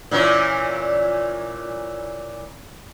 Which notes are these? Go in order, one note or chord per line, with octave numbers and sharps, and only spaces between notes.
A#2 E3 C#4